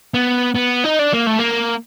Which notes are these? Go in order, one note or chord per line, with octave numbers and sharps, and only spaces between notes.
B3
B3
D#4
D4
A#3
A3
A#3